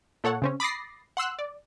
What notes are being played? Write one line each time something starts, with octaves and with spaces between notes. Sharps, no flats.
A#2 A4 C#5 F#5
C#3 C4 C#4
B5 D6 D#6 A6 A#6 C7
F#5 C6 E6 F#6
D5